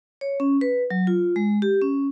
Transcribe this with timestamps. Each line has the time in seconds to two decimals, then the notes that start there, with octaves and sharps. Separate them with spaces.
0.21 C#5
0.40 C#4
0.61 B4
0.90 F#3
1.07 F4
1.36 G#3
1.62 G4
1.81 C#4